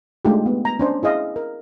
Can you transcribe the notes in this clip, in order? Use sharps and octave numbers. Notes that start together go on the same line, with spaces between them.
G#3 A3 D4 D#4 F4 G4
B3
A#5
C#4 D4 C5
E4 G#4 D#5 F5
A#4